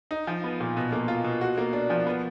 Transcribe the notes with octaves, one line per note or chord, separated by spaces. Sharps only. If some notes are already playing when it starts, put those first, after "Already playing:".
D#4
F3
B3
A#2
B2
A#3
F4
B2
F#4
A#3
D4
F3
B3